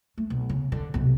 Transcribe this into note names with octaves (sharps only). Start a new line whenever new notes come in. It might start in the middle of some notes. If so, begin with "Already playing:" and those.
A3
B1
C#3
D3
B1 C3